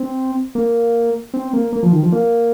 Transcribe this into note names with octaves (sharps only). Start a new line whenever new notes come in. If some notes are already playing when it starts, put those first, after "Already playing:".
Already playing: C4
A#3
C4
A#3
A#3
F3
D#3
F3
A#3